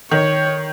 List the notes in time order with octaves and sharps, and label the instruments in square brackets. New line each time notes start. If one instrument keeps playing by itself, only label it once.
[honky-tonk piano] D#3 [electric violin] C#5